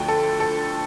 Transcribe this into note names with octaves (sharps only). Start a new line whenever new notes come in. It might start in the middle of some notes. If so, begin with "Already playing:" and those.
Already playing: D2 D3 F3 A3 G5
A4
A4